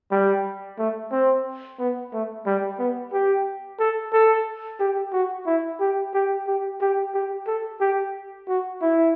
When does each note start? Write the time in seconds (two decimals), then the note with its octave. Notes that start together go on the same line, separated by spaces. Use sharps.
0.11 G3
0.78 A3
1.11 C4
1.79 B3
2.13 A3
2.46 G3
2.79 B3
3.13 G4
3.80 A4
4.13 A4
4.80 G4
5.13 F#4
5.46 E4
5.80 G4
6.14 G4
6.47 G4
6.81 G4
7.14 G4
7.47 A4
7.81 G4
8.48 F#4
8.82 E4